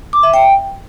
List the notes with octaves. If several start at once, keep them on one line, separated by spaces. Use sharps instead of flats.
D6
E5
G5